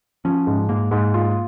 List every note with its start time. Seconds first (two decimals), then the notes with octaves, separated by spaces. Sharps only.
0.25 F3 C#4
0.47 G#2
0.69 G#2 A#3
0.91 G#2
1.14 F4